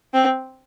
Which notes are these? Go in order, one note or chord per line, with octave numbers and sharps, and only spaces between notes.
C4